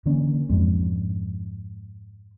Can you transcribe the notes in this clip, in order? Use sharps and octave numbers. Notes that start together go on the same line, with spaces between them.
D3 E3 A#3 C#4
F2 G#2 C4